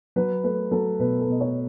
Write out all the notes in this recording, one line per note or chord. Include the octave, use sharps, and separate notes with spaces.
F#3 B4
A3 B4
F#3 A4
B2 B4
A4
B2 D#5
A4 C#5